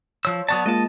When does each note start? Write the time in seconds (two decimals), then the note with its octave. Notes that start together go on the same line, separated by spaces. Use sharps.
0.25 F3 C#5 E6
0.48 F#3 B3 D5 A5 C#6 D#6
0.66 G#3 A#3 F4 D#5 A5